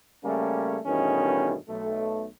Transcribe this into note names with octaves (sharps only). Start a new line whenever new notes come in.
C#3 G3 A3 A#3 C#4
E2 G2 B2 D#3 A3 C#4
B1 A3